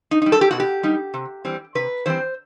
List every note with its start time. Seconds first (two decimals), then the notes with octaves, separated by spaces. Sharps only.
0.11 D#4
0.22 G3 D#4
0.32 A4
0.41 G4
0.51 B2 F#4
0.60 G4
0.83 G3 D#4
1.14 C3
1.45 E3 G3 C4
1.75 C3 B4
2.06 E3 G3 C4 C5